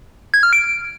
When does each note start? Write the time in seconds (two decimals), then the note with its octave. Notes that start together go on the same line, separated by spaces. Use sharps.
0.34 G#6
0.43 F6
0.53 D7